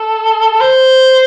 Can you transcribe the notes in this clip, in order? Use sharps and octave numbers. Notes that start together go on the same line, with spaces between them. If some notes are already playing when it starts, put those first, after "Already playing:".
Already playing: A4
A4
C5